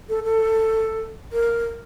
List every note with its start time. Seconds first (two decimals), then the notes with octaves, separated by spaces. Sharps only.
0.09 A4
0.24 A4
1.32 A#4